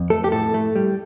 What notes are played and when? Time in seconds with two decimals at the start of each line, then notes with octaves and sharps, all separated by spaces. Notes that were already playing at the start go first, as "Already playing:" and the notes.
Already playing: F2
0.10 A3 A4
0.24 G4
0.32 A2 A4
0.54 A3
0.76 G3